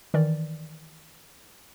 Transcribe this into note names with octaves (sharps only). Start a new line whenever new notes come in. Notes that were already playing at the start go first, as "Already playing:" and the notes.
D#3 E3 A#4 D5